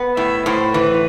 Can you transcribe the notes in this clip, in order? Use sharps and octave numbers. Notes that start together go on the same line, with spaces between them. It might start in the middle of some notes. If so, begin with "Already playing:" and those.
Already playing: B3
A2 E5
A2 C5
E3 B4